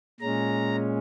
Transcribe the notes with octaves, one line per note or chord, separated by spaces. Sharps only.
A#2 G#3 C#4 A#5